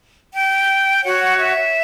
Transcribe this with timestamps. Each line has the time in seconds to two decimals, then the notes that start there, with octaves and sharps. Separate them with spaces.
0.32 G5
1.03 F#4 C#5 F#5
1.38 E5